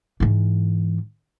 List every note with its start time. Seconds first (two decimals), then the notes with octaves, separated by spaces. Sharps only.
0.20 G#2 E3